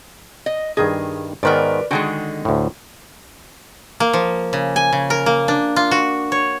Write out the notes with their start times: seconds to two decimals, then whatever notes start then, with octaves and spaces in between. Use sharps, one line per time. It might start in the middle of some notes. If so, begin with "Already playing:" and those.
0.46 D#5
0.77 G2 D#3 G#4 D#5
1.43 G#2 D#3 B3 A#4 B4 D5
1.91 D3 D#3 G#3 F#4 G5 G#5
2.45 D2 A2
4.00 A#3
4.13 F3
4.53 C#3
4.76 G#5
4.93 C#3
5.10 A#4
5.26 A#3
5.48 D4
5.76 F4
5.91 F#4
6.32 C#5